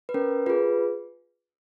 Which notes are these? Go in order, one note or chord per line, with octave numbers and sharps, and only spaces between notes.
B4
C#4 A#4
F4 G#4 B4